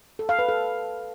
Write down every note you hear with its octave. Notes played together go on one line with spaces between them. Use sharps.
A4
F5
B4
A4